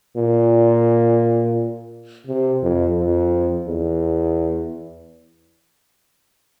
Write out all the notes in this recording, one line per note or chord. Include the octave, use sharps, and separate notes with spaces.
A#2
C3
F2
F2
E2